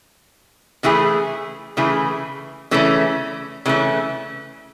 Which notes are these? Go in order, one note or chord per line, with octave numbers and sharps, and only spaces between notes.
C#3 E3 A3 E4 G#4
C#3 E3 A3 E4 G#4
C#3 E3 A3 C#4
C#3 E3 A3 C#4